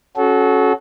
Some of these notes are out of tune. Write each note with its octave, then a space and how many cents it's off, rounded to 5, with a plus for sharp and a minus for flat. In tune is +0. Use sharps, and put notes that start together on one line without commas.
C#4 +0 F#4 +0 A4 -30